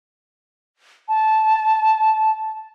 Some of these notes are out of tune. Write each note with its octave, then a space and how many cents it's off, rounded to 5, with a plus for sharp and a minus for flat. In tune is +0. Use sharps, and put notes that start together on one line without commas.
A5 -10